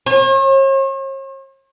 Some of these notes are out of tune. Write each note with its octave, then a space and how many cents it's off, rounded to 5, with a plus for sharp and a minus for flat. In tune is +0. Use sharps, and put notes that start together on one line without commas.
C#5 -45